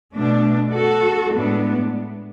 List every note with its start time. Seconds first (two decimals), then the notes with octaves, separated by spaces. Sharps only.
0.14 B2 A3 D4
0.74 F#4 A4
1.33 A2 G#3 B3 D4